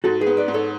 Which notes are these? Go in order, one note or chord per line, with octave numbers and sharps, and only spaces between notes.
G#2 F#4 A4
G#4 B4
B3
B4 D5
G#2
A4 C#5